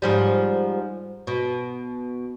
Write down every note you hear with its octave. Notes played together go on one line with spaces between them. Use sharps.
G#2 F3 G3
B2